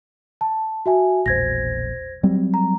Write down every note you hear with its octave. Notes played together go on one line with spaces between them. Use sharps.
A5
F#4 E5 G#5
E1 A#1 C5 G#6 A#6
F#3 G3 C4
A#5